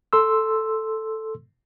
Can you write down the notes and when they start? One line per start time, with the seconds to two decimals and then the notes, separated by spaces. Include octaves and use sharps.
0.13 A4 C6 E6